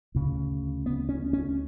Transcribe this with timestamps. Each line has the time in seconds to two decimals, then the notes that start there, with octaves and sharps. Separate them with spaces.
0.15 D2 C#3
0.86 B3
1.09 C#4
1.33 C#4